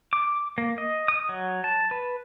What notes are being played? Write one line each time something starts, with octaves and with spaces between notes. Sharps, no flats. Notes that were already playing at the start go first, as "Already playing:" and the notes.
D6
A#3
D#5
D#6
F#3
A5
B4